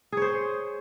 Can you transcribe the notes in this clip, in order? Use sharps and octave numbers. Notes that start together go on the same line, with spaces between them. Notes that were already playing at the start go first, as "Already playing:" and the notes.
G#4 C5 C#5